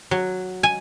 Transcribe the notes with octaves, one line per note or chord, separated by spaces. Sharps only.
F#3
G#5